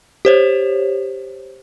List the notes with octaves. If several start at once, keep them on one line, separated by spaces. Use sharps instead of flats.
G4 C5 C#5